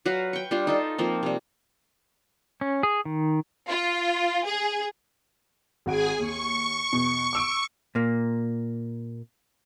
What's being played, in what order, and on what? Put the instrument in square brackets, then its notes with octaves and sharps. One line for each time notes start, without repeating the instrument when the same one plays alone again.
[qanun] F#3 F#4 B4 F5
G5 C#6
G3 D4 F4
D#4 F4 A4
F3 A#3 C4
C3 G3
[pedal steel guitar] C#4
G#4
D#3
[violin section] F4
G#4
[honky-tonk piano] G#1 F#4 D7 [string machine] G#4 G#5
[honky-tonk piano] D#2 [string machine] C#6
[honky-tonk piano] E2 B2
D6 E6 D7
[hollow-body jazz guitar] A#2 A#3